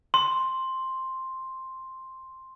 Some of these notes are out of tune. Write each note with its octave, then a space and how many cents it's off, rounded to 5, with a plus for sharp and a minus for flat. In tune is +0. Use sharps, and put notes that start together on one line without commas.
C6 +5